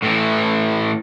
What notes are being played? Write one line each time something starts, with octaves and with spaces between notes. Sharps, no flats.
A2 E3